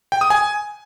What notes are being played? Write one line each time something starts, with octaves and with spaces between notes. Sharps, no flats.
G5
D#6
G#5